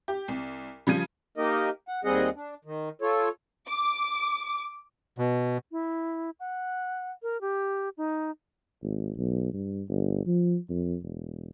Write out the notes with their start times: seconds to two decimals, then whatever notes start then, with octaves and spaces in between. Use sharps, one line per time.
0.08 G4
0.28 C2
0.87 C#3 F3 G3 G#6 D#7
1.38 A#3 D#4 G4 A#4 D#5
1.88 F#5
2.04 D#2 G3 C4 G#4 D#5 F#5
2.36 D4
2.65 D#3
3.02 F4 A4 C#5
3.69 D6
5.18 B2
5.72 E4
6.40 F#5
7.23 A#4
7.41 G4
7.97 D#4
8.83 G#1
9.17 B1
9.53 G2
9.88 G1
10.26 F3
10.70 F2
11.03 E1